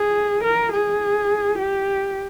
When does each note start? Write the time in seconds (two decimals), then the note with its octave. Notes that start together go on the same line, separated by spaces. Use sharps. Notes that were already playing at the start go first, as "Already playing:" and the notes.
Already playing: G#4
0.44 A#4
0.72 G#4
1.58 G4